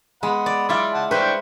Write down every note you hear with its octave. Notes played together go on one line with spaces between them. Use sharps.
G#3 F#5 B5
D5
E4 F4 D5 B5 D6
F#5 A5
D4 B4 C5 G5 C#6